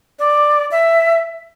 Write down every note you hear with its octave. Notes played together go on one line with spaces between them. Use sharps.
D5
E5